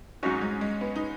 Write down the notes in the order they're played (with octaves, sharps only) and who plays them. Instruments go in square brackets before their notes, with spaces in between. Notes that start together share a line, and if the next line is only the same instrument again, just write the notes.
[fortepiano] G#2 F#3 D#4 F#4 [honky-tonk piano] C#4
[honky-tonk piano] G#3
G#3
B3
D#4